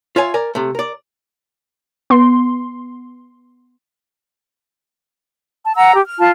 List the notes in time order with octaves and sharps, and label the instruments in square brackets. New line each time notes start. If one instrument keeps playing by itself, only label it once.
[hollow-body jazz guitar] F4 C#5 E5 F5 G#5
A#4 D5 G#5
C3 A3
A#4 D5
[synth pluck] B3 C6
[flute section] A5
F#5 A#5 E6
G4
F6
F4 A5